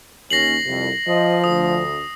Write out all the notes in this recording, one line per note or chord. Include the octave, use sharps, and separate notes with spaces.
D#2 C#4 A#6 C7 F#7
C2 F2
F3 C5 D#5
D2 D#6